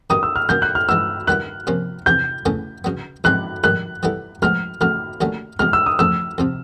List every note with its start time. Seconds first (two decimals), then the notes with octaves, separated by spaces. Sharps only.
0.10 D#3 F#3 B3 D#4 G4 D#6
0.23 E6
0.36 F6
0.49 E2 B2 F#3 A#3 C#4 G6
0.62 F#6
0.75 F6
0.89 E3 G#3 B3 E6
1.27 D#3 G3 B3 E4 F#6
1.67 C3 F3 A#3 C#4
2.06 E2 C3 E3 G6
2.46 E2 C#3 E3 A3 C#4
2.84 C#3 F#3 B3
3.24 A#1 G#2 E3 G#3 C4 F#6
3.64 A#1 G#2 D#3 G3 F#6
4.03 E3 G3 B3 E4 A4
4.42 B1 A2 F3 G#3 B3 F6
4.81 E2 C#3 F#3 A3 F6
5.21 D#2 D3 F#3 A3 C#4
5.59 E2 B2 G#3 F6
5.73 E6
5.86 D#6
5.99 E2 C#3 F3 A3 E6
6.38 F2 C3 F3